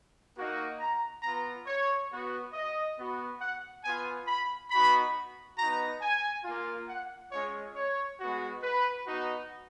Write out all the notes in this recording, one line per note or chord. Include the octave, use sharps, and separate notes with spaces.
A#3 D#4 F#4
A#5
B3 F4 A#5
C#5
B3 F#4
D#5
B3 F#4
F#5
B3 F4 G#5
B5
B3 D#4 F#4 B5
B3 D#4 F#4 A#5
G#5
A#3 F4
F#5
G#3 C#4 F4 C#5
C#5
G#3 B3 F#4
B4
B3 D#4 F#4